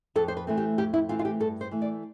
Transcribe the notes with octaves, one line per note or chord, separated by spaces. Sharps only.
F2 A4
C5
B4
E3 A3 C4
G4
F2 G4
E4
E3 A3 C4 F4
F4
G4
G2 A4
C5
E3 A3
D5